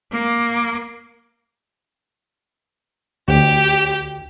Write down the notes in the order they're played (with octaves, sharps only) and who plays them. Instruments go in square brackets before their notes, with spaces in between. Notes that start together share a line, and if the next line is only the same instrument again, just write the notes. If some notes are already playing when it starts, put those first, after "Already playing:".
[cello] A#3
[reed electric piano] D2 [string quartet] G4